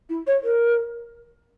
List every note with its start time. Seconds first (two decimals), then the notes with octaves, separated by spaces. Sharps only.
0.09 E4
0.27 C#5
0.44 A#4